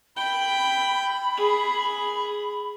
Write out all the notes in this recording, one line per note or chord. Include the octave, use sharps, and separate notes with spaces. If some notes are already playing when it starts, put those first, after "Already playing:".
G5 B5
G#4